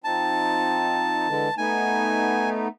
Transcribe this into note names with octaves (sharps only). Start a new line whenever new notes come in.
F3 C4 D#4 A5
D3 E3 G#3
A3 B3 D#4 G#5